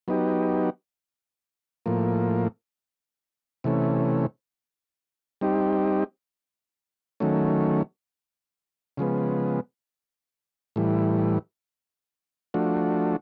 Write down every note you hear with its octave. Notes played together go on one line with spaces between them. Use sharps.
F#3 B3 D#4 G4
A2 F3 A#3
C3 E3 A3 C#4
G3 C4 D#4 G4
D#3 F#3 A3 C#4
C#3 F3 G#3 B3
A2 E3 G3
F3 A3 D4 F#4